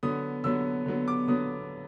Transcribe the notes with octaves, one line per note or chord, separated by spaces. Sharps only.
D3 F#3 B3 D#6
D3 F#3 B3 E6
D3 F#3 B3
D6
D3 F#3 B3 D#6